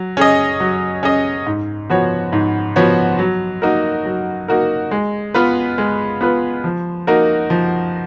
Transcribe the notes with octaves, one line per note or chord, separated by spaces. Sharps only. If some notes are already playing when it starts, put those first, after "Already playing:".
Already playing: F#3
C#4 G#4 D#5
F#3
C#4 G#4 D#5
G#2
F3 B3 F#4 C#5
G#2
F3 B3 F#4 C#5
F#3
A#3 D#4 F#4 A#4
F#3
A#3 D#4 F#4 A#4
G#3
B3 F4 B4
G#3
B3 F4 B4
F3
A#3 D#4 F#4 A#4
F3